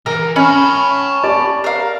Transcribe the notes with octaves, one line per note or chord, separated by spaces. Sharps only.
E3 A#4
C#4 A5 B5 C#6
G4 D5
A#4 F5